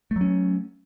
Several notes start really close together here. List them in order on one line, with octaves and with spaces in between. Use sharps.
A3 F#3 C#4